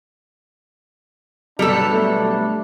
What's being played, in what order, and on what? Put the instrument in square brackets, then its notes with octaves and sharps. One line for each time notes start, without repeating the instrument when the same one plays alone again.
[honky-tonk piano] G1 B2 F#3 [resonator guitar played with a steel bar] G3 A4 [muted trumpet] D4
[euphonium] A3